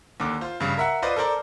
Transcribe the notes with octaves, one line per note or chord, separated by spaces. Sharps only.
D#2 D3 D6
F4 C5
G2 C#3
A#4 E5 F#5
F4 B4 C5 D5 D#5
A4 A#4 C5 D5